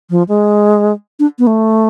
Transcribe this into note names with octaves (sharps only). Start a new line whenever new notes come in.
F3
G#3
D4
B3
A3